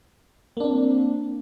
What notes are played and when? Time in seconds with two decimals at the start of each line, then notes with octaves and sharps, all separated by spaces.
0.57 A#3
0.60 D4
0.64 C4